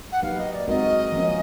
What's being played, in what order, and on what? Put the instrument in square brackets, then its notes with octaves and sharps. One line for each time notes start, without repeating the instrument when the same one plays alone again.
[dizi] F#5
[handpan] F#3 A#3 D#4 G4 B4 [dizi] F5
[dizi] D#5
D5
[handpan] G#3 C4 D#4 F#4 A#4 [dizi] D#5
[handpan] F3 A#3 C#4